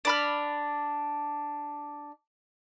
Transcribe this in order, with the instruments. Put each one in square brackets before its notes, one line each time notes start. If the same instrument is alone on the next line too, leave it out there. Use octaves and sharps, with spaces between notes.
[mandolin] D4 B5 F6